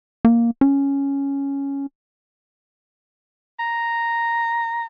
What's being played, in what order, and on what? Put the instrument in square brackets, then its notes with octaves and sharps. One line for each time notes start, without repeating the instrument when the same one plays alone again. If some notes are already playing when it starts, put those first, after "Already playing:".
[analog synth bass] A#3
C#4
[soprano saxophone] A#5